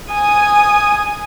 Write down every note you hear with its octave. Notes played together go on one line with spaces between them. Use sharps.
G#5 D#6